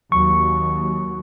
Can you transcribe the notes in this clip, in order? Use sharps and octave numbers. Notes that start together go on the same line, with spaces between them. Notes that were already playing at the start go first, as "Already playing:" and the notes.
D#2 F#3 C#6